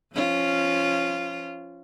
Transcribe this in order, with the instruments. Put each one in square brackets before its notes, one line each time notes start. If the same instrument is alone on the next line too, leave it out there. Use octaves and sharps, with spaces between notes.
[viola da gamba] F3 C#4 F4